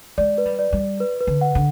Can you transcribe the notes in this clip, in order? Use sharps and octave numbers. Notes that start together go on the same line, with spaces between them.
G#3 D5
B4
G3
D5
G3
D5
B4
B4
D3
F#5
D3